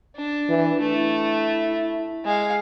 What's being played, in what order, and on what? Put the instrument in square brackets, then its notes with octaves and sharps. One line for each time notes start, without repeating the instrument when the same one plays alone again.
[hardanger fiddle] D4
[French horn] E3
[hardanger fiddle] A3 [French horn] E4
[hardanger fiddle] G#3 F5